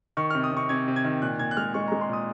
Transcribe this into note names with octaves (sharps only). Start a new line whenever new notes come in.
D#3 C#6
C3 F6
D#6
C3 C#6
C3 G#6
C3
G#6
D#3
A#2 F#6
A#2 G#6
F#6
G#3 F6
G#3 C#6
G#3 A#5
C6
A#2 D#6